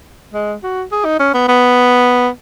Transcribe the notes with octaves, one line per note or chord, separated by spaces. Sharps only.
G#3
F#4
G#4
D#4
C#4
B3
B3